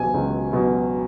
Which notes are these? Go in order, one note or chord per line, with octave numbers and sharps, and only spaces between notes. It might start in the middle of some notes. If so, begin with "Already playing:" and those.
Already playing: C#2 B2 F#3 G#5
C#2
B2 F#3